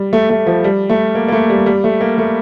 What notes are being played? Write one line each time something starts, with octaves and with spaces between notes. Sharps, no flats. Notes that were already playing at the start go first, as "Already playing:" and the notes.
Already playing: G3
A3
A3
F3
G3
A3
A#3
A#3
A3
G3
G3
A3
A#3
A3